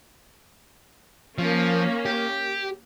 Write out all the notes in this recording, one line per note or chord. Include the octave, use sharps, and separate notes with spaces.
F3 A#3 C#4
G4